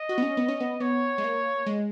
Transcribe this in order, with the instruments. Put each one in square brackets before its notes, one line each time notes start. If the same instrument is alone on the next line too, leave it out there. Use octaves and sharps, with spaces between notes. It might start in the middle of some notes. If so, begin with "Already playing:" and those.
Already playing: [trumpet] D#5
[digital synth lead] F#4
B3
C#4
B3
C#4
B3
[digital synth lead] B3 [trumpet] C#5
[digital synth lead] G#3
A#3
G#3